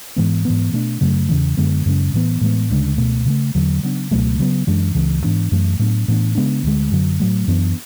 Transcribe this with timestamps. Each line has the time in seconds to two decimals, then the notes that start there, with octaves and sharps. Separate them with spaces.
0.16 G#2 E3 G#3 B3
0.45 G#2 E3 B3
0.73 B2 A3 D4
1.01 F#2 C#3 F#3 A3
1.29 E2 C#3 E3
1.57 F#2 D3 G#3 B3
1.86 F#2 C#3 G#3 C#4
2.14 A2 E3 B3
2.41 A2 E3 G#3 B3
2.70 D2 C#3 G#3 D4
2.98 C#2 B2 A3
3.26 C#3 F#3
3.30 A3
3.55 E2 D3 F#3
3.83 C#3 F#3 B3 D4
4.11 C#2 B2 F#3 A3
4.39 C#3 F#3 B3
4.67 F#2 E3 G#3 D4
4.95 C#2 C#3 E3
5.24 G#2 E3 B3 D4
5.52 F#2 E3 A3
5.79 A2 F#3 B3 D4
6.08 A2 E3 B3 D4
6.35 C#3 G#3 B3 D4
6.63 D2 D3 G#3
6.91 F#2 D3 F#3
7.20 A2 F#3 A3
7.48 F#2 E3 B3 D4